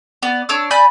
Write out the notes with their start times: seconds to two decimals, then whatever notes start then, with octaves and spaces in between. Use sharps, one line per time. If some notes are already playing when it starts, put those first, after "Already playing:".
0.23 B3 D5
0.49 D4 C#5 D6 E6
0.71 D5 G#5 B5 G6